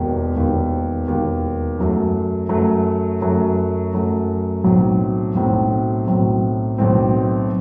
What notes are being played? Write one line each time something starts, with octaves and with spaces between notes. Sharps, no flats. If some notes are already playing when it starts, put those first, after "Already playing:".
Already playing: E1 D#2 D#3
E1 D#2 D#3
E1 D#2 D#3
F#2 F#3 A3
F#2 F#3 A3
F#2 F#3 A3
F#2 F#3 A3
B1 A2 F#3 C4
B1 A2 F#3 C4
B1 A2 F#3 C4
B1 A2 F#3 C4